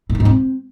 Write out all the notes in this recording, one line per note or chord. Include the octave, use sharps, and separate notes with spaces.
A2
D#3
G#2
C4